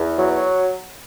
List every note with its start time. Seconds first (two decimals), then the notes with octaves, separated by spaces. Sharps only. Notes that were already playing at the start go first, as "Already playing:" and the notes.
Already playing: E2
0.18 F#3